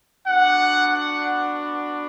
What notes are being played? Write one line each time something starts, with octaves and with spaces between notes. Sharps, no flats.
B3 D4 F#4 F#5
F#5